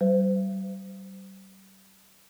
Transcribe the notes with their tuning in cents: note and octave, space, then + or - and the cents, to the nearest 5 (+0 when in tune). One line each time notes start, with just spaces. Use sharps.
G3 -35 C5 -35